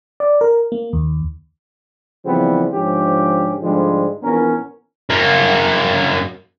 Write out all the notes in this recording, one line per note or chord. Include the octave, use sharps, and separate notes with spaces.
D5
A#4
A#3
D#2
C#3 E3 F3 G3 B3 C4
G#2 D3 F3 G#3 C#4 G4
G#2 D3 F3 G3 G#3
A#1 E3 B3 C#4 A#4
F#2 A#3